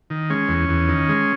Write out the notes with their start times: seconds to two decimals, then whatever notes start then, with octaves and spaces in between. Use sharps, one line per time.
0.10 D#3
0.30 G#3 C#4
0.49 E2
0.69 E2
0.89 D#3
1.09 G#3